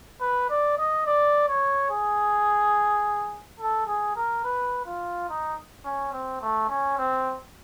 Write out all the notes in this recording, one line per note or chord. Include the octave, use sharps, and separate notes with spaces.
B4
D5
D#5
D5
C#5
G#4
A4
G#4
A#4
B4
F4
D#4
C#4
C4
A3
C#4
C4